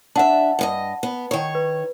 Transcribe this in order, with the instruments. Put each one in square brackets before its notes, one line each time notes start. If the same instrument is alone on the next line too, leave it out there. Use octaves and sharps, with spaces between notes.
[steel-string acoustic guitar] D4 E5 [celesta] F#5 A5
[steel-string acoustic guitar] G2 G#4 D#5
B3
D#3 C#5
[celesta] B4